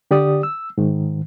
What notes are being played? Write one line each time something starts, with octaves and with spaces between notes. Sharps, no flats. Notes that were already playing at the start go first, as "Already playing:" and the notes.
D3 G4 D5 D#6
E6
G#2 D#3